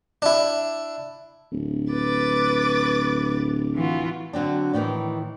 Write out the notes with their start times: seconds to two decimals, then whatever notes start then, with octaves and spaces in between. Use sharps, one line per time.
0.22 D4 E4
1.52 D1
1.91 B4 D6 A6
3.75 E3 F4 F#4
4.33 D3 F#3 C4 D4
4.73 A2 D#3 E3 D#4